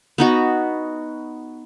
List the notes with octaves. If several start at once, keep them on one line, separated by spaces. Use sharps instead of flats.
B3 D#4 F#4